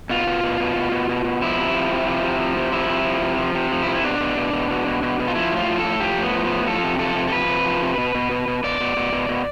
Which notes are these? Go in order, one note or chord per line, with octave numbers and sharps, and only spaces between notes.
B2 F4
B2
B2
B2
B2
B2
B2
B2
F3 E4
C3
F3
C3
F3
C3
F3
C3
F3 E4
C3
F3
C3
F3
C3
F3
E4
C3
E4
B2 D4
B2
B2
B2
B2
B2
B2
B2
F4
F3 E4
A2 F4
F3
A4
A2
F3 G4
A2
B3
F3
B3
A2
F3 A4
C3
F3 A4
C3
A4
F3 B4
C3
F3
C3
B2
B2
B2
B2
B2 D5
B2
B2
B2
B2